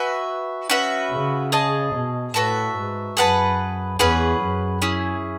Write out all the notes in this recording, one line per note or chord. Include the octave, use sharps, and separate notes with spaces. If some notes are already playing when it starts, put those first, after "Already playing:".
Already playing: F#4 B4 E5 G#5
C#4 F#4 B4 E5
C#3
G#4 D#5 A5
B2
A2 F#4 B4 E5 A5
G#2
F#2 G#4 B4 F#5 A5
E2 C#4 G#4 B4 F#5
F#2
C#4 E4 G#4